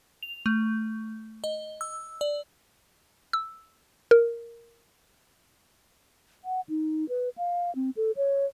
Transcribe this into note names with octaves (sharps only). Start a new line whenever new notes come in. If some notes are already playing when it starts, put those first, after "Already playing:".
F7
A3
D#5
E6
D5
E6
A#4
F#5
D#4
B4
F5
C4
A4
C#5